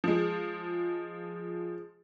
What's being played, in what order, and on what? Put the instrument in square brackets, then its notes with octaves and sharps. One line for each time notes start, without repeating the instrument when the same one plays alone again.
[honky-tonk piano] F3 G#3